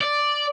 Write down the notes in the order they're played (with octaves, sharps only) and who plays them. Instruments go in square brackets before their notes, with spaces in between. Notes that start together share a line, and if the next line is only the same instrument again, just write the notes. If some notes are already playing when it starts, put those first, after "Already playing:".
[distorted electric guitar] D5